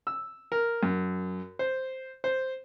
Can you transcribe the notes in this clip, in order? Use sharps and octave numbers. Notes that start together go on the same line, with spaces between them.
E6
A#4
F#2
C5
C5